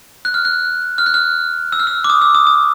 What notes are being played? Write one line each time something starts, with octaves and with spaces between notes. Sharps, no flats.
F#6
F6
F#6
F6
F#6
F6
E6
F6
E6
D6
D#6
E6
D#6
D#6